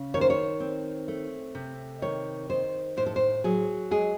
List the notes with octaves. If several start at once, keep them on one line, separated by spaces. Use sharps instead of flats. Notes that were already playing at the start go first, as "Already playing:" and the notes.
Already playing: C#3
D#3 C#5
C5
C#5
C4
A3
C3
D#3 C#5
D#3 C5
A2 C5
A4
C5
F#3 G#4
G#3 G#4